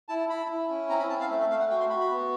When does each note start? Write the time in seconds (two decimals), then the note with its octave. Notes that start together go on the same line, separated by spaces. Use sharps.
0.08 E4 A5
0.29 E4 B5
0.50 E4
0.69 C#4
0.89 C4 A#5
0.99 B5
1.10 C4 A5
1.20 F5
1.30 A3 E5
1.40 E5
1.50 A3 F5
1.60 F#5
1.70 F#4 G5
1.80 C6
1.90 F#4 B5
2.01 B5
2.10 B3